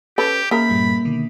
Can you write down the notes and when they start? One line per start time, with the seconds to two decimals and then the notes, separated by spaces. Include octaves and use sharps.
0.18 C#4 G4 A4 B4
0.51 C#3 A#3 A#4 B5
0.70 G2 A#2 G3
1.05 B2 D3 D#3